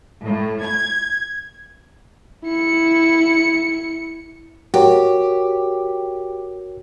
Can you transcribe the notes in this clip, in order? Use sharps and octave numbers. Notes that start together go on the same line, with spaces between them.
A2
G#6
E4 C#7
F#4 G4 A#4 C#5